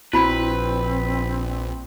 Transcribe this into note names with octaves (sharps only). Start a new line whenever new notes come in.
A#1 C4 E4 F#4 B4 B5